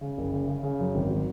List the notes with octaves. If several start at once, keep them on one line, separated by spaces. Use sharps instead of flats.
C#3
F#1
C#3
C#3
C#3
F#2
G#1
F#3